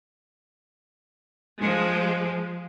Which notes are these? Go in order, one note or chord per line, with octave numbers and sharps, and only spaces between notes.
F3 G#3